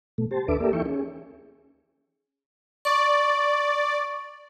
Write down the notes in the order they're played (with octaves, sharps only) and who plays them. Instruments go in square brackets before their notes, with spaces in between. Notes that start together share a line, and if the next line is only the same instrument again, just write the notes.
[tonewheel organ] B2 A3
G4 C5 A5
D#2 D4 A4 B4 E5 D6
A#3 G4 A4 A#4 D5 E5
E3 D#4 A4 E5 G5 C#6
C#4 G#4
[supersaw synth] D5 [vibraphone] C#6